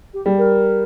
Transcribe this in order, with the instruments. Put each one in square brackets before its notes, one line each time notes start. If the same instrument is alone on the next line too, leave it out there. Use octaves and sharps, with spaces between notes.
[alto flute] G4
[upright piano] G3
[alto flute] A#4